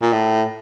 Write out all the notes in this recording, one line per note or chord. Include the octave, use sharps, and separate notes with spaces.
A#2
A2